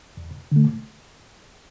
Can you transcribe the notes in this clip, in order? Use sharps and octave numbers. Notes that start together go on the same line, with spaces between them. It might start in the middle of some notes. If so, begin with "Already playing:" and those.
E2
D3 A3